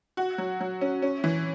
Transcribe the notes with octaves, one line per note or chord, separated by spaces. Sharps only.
F#4
F#3
F#3
C#4
C#4
E3